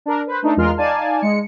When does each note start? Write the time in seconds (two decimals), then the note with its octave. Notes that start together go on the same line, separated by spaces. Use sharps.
0.06 D4 A#4
0.27 B4 C5
0.42 A3 D4 D#4
0.57 E2 G#3 F4 A#4 C6 F6
0.77 D#4 D5 F5 G#5 A5
1.22 G#3 C#7